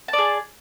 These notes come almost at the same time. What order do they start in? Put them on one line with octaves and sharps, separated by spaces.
A5 D5 G#4